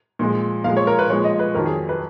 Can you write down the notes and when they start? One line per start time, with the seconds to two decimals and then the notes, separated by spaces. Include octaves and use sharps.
0.19 A#2 F3 G#3
0.64 A#2 F3 G#3 F5
0.77 C#5
0.87 A#4
0.99 B4
1.10 A#2 F3 G#3 C#5
1.24 D#5
1.39 B4
1.54 F2 D#3 F#3 A#4
1.66 G#4
1.89 B4